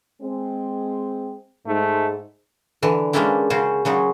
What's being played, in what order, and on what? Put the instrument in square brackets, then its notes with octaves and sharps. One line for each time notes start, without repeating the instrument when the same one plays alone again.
[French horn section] G#3 C4
[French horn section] G#2 [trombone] A3
[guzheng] D3 E3
G#3 A#3 C#4 D4 E4 G4
C#3 C#4 F#4 C5
C#3 F#3 G#3 D#4